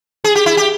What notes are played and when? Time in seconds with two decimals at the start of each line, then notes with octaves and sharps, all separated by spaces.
0.24 G#4
0.35 G4
0.46 E4
0.57 G4